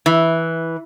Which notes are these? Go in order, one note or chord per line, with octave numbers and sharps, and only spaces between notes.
E3